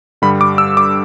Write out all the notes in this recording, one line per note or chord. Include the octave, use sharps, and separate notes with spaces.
G2 D3 G3 B5
D6
E6
D6